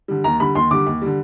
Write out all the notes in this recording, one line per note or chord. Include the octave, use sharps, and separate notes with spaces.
D3 G3
D#2 A#5
D3 G3 B5
D#2 C6
D3 G3 D6
D#2
D3 G3